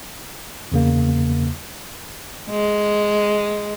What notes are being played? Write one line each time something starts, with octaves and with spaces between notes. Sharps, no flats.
E2 C#3 A#3
G#3